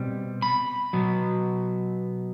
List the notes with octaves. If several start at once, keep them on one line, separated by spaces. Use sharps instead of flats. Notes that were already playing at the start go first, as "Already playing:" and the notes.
Already playing: B2 G3 C4
B5
B2 F#3 B3